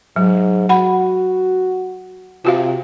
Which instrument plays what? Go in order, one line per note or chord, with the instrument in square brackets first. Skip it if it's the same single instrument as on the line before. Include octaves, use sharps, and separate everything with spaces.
[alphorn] G#2 [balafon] F#3
[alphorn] F#4 [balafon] F#5 B5
[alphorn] C3 [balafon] F4 F#4 F5